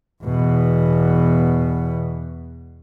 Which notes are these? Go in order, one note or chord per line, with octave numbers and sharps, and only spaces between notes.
E2 B2